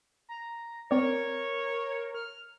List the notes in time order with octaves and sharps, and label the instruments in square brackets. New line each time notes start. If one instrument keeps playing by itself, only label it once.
[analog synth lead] A#5
[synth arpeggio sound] C4 D5 [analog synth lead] A#4 [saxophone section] C#5
[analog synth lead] F6